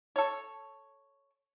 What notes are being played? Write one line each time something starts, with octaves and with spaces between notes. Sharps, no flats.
A4 C#5